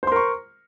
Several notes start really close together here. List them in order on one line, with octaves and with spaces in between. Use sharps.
C5 C6 A#4 C#6